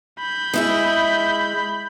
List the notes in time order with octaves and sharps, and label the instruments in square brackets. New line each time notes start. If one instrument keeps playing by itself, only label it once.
[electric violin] B5 G6
[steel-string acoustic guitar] G#3 E4 G#4